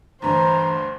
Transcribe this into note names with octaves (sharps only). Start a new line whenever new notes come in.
D2 G2 E3 C5 A#5